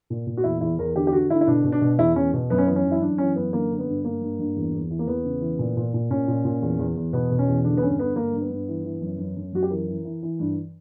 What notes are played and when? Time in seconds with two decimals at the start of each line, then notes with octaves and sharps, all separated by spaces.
0.10 A#2
0.27 A#2
0.37 F#4
0.44 E2 E4
0.61 E2 E4
0.79 E2 A#4
0.95 D3 G4
1.07 G4
1.12 D3 F#4
1.30 D3 E4
1.41 E4
1.47 B2 D4
1.64 B2
1.72 D4
1.81 B2
1.99 E2 E4
2.15 E2 C#4
2.34 B2
2.50 F#2 B3
2.58 C#4
2.66 E3 B3
2.76 C#4
2.84 F#2
2.92 E4
3.02 F#2 D4
3.18 E3 C#4
3.35 F#2 B3
3.53 D3 A#3
3.70 D3
3.79 B3
3.88 G2
4.05 G2 A#3
4.22 G2
4.39 G2
4.56 E2
4.73 E2
4.90 E3
4.99 A#3
5.07 E2 B3
5.25 C#3
5.41 E3
5.59 A#2
5.77 A#2
5.94 A#2
6.11 A#2 C#4
6.28 A#2
6.45 A#2
6.62 E2
6.79 E2
6.96 E2
7.13 B2 B3
7.31 B2
7.39 C#4
7.48 E2
7.64 D3 D4
7.77 B3
7.82 G2 C#4
7.99 D3 B3
8.16 G2 A#3
8.33 G2
8.41 B3
8.50 G2
8.68 E3
8.84 E3
9.01 F#2
9.19 F#2
9.37 F#2
9.53 F#2 F#4
9.63 G4
9.70 E3 A#4
9.88 E3
10.05 E3
10.23 E3
10.39 G2